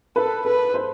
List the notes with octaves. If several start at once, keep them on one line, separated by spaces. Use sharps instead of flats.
A4 B4
A4 B4
C5